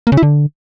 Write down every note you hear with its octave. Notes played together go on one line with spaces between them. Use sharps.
A#3
C#3
E4
D3